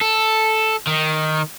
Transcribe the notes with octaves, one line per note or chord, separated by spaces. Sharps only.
A4
D#3